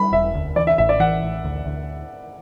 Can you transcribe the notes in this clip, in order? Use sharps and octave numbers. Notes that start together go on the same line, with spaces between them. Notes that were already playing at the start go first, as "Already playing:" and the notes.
Already playing: G3 B5
E1 E5
D2
E3 D5
E5
A1 E5
D5
E3 F#5
A1
D2
D2